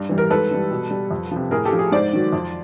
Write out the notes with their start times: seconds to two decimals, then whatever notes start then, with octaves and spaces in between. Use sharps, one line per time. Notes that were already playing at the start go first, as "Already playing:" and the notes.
Already playing: G2
0.09 E3 G3
0.18 A#4
0.30 G#2 A4 B4
0.51 E3 G3
0.71 B2
0.91 G3
1.11 F2
1.31 C3 F3
1.51 A2 G#4 A#4
1.65 G4 A4
1.72 F3
1.79 G#4
1.92 G#2 C5 D5
2.13 D#3 F#3
2.33 F2